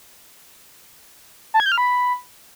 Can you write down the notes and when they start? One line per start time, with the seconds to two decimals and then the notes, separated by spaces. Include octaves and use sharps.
1.54 A5
1.60 G#6
1.66 G6
1.72 F6
1.78 B5